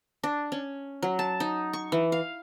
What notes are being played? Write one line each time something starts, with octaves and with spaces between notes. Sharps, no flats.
D4
C#4
F#3
A5
D#4
C#6
E3
F5